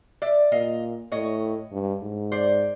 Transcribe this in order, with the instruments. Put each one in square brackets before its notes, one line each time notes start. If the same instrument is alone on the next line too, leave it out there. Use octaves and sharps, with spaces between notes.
[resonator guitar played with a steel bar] D5 E5
[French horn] A#2 [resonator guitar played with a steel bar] D#5 F5
[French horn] A2 [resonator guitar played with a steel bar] C#5 D#5
[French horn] G2
G#2
[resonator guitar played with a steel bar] C5 D5